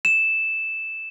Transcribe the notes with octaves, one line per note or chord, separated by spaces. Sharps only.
E7